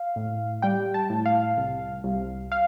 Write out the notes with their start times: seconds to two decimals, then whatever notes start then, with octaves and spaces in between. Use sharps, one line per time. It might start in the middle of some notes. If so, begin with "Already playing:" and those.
Already playing: F5
0.16 A2
0.62 G3 G5
0.94 A5
1.10 A2
1.26 F5
1.57 C2
2.04 C2
2.52 F5